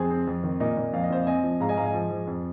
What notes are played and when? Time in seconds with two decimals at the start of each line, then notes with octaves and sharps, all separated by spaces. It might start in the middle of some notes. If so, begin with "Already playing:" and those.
Already playing: F2 C4 G#4 C5
0.10 C4
0.27 F2
0.43 D#3
0.60 A#2 A#4 D#5
0.77 A#2
0.93 F2 F5
1.03 D#5
1.10 F2 C5 F5
1.27 C4 D#5 G#5
1.43 F3
1.60 G#2 F5 A#5
1.69 D#5 G#5
1.77 G#2 F5 A#5
1.86 D#5 G#5
1.94 F3
2.11 F3
2.27 F2